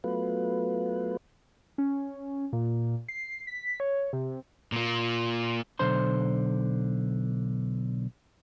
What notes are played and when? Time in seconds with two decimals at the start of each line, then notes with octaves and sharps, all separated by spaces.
0.04 F#3 A3 B3 F4 B4
1.78 C#4
2.53 A#2
3.09 C7
3.47 B6
3.80 C#5
4.13 C3
4.72 A#2 A#3
5.79 B1 D3 C5 C6